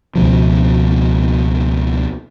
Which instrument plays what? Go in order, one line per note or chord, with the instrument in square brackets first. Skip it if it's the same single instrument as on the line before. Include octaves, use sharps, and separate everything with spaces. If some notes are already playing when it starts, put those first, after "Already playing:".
[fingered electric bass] C#2 B2 F3